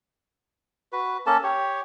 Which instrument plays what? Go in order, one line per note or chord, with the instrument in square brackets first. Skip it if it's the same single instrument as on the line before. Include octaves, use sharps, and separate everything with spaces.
[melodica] F#4 B4
A#3 C#4 A4 A5
G4 C#5